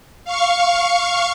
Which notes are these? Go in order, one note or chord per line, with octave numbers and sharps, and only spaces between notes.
F5 C#6